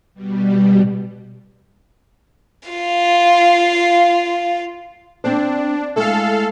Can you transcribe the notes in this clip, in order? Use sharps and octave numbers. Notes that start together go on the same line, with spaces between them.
B2 G3
F4 F5
C4 D4 C5
G#3 A3 E4 A4 F5